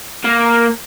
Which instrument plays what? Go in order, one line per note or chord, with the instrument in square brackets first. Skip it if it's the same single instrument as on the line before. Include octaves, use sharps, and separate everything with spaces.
[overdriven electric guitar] A#3